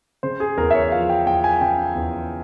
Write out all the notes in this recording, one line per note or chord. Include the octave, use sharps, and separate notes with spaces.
C#3 C5
G#4
E2 A#4
E5
C#5
F3 F5
G5
E2 G5
G#5
C#3 G5
E2